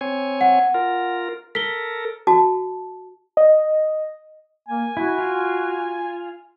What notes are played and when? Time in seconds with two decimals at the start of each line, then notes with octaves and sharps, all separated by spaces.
0.01 C4 C#5 G#5
0.41 F#5
0.74 F4 A#4
1.55 A4 A#4 B6 G7
2.27 F#4 A5
3.37 D#5
4.68 A#3 G#5
4.97 E4 F#4
5.18 F4